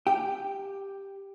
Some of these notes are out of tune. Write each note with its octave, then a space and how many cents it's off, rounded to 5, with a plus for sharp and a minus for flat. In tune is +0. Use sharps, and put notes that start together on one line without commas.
G4 +5 G5 +0